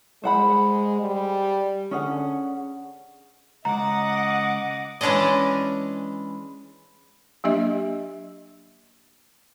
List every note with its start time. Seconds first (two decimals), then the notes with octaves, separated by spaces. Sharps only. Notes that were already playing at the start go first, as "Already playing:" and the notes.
0.24 G#3 C5 F#5 B5
1.01 G3
1.91 D3 C#4 G#4 F#5
3.65 C#2 D#5 F#5 A#5 D6
5.01 E3 G#3 C#4 D4 D5 D#5
7.44 F#3 A#3 D4 G4 D#5 E5